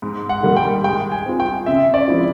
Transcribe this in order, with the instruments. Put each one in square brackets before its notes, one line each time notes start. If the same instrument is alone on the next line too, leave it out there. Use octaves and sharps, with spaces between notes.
[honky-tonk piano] G#2
[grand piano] F#5
[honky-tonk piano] D#3 G3 A#3
[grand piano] G5
[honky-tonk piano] G#3 [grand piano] G5
[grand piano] G#5
[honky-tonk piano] C4 F4
[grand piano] G5
[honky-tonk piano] C#3 [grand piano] E5
[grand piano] D5
[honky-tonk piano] F3 G#3 C4 E4